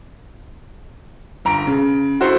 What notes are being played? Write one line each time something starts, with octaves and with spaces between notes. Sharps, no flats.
G1 A#5 D7
C#3
E4 F#4 A4 C5